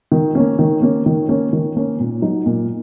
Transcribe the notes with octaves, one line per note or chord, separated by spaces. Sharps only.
D#3
A#3 C#4
D#3
A#3 C#4
D#3
A#3 C#4
D#3
A#3 C#4
A#2
F#3 D#4
A#2